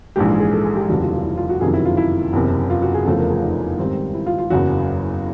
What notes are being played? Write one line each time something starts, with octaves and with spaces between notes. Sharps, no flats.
A#1 G#2 E3 G#3 G4
G#4
G#4
A4
G#4
G4
F1 D#2 C#3 E3 G3 F#4
F4
F4
E4
F4
F#4
F#1 F2 C3 D#3 F#3 G#4
E4
F4
E4
F#1 E2 C3
F4
F#4
G#4
F1 E2 C#3 F3 A3 A4
A#4
G#4
D#4
G#2 D#3 G3 C4
E4
F4
F4
F#1 E2 C#3 F#3 F#4